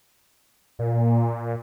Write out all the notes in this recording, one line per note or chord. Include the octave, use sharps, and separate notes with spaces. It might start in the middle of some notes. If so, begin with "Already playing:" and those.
A#2